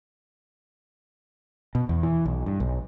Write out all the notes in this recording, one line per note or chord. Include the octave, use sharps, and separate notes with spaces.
B2
E2
E3
B1
G2
B1